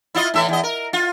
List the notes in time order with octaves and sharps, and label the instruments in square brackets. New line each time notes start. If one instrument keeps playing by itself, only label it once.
[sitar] E4 F4 D#5
A2 E3 E5
E2 D#5
A#4
F4